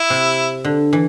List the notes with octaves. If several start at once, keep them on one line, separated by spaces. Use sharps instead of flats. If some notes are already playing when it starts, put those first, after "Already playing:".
Already playing: E4
C3
D3
E3